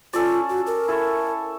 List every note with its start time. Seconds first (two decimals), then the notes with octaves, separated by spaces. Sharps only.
0.13 C#4 F4 A4 D5
0.49 F#4
0.67 A#4
0.88 E4 A4 C#6